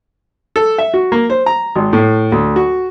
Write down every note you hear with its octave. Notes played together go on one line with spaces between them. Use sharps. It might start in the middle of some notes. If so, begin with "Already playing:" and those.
A4
E5
F#4
A#3
C5
A#5
G#1
A2
D2
F#4